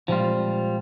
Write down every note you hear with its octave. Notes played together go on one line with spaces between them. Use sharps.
A#2 F3 G3 G#3 C4 F4